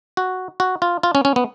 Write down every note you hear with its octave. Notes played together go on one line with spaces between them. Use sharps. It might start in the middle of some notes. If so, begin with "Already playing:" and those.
F#4
F#4
F4
F4
C#4
C#4
B3